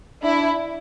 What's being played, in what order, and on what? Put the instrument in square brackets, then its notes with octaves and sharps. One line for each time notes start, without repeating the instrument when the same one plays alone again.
[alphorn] D4 [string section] E4